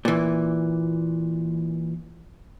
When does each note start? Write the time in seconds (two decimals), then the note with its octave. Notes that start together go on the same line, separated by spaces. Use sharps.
0.05 A#2 E3